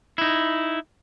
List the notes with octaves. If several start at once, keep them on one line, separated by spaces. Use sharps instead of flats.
D#4 E4